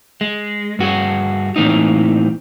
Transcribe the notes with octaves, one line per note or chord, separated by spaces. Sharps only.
G#3
G2 F#4 G#4
A2 E3 A#3 C4 D#4